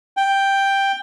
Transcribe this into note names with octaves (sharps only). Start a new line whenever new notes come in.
G5